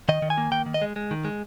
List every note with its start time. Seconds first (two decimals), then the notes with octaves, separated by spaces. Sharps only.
0.09 D#3 D#5
0.22 D#3
0.30 G#5
0.38 A#3
0.52 D#3 G5
0.66 D#3
0.74 D#5
0.82 G#3
0.96 G#3
1.11 D#3
1.25 G#3